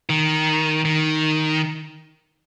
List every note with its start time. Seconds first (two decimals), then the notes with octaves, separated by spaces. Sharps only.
0.10 D#3
0.85 D#3